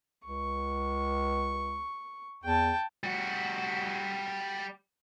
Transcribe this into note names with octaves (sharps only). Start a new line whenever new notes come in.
C#2 C#6
E2 G5 A5
G3 F#4